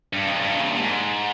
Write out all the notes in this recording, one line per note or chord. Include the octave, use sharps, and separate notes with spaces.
G2
F2
G2
D#3
C#3
C3
A#2
G#2